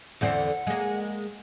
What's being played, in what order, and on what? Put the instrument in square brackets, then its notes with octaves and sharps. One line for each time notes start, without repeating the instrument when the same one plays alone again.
[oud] E2 D3 C4 [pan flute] F#5
[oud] G#3 A#3